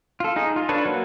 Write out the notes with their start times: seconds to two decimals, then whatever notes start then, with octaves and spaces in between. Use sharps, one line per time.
0.20 F4 A4
0.36 D#4 G#4
0.56 F4
0.69 D4 A4 B4 C#5
0.85 F#3 A#3